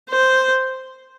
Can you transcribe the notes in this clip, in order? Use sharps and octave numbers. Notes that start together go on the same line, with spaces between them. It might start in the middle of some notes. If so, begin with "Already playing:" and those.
C5